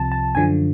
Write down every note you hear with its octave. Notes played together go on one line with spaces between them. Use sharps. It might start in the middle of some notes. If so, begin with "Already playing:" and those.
Already playing: C2 C3 F3 A5
A5
F#2 D3 F3 G#5